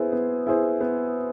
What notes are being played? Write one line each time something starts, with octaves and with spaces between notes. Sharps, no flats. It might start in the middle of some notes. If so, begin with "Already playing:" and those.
Already playing: B3 E4 G#4 C5
B3
E4 G#4 C5
B3